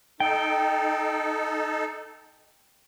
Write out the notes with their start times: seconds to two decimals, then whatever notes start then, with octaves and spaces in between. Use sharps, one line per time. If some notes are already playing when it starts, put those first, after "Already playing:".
0.20 D#4 A4 G5